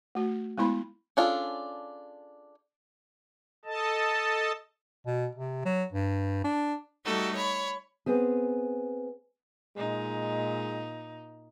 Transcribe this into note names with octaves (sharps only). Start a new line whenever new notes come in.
A3 F#4
G#3 B3 E4 B5 C6
C#4 D4 F4 G#4 A4
A4 D#5 A5
B2
C3
F#3
G2
D4
G3 A3 D#4 F#4 A4
C#5 B5
B3 C4 G#4
A#2 G#3 D#4